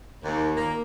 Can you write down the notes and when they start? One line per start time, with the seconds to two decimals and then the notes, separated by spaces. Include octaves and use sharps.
0.24 D#2
0.56 A#3